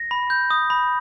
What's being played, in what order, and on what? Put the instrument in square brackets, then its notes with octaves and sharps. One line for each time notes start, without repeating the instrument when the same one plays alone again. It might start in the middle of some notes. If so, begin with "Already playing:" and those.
Already playing: [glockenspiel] A#6
B5
G6
D#6
B5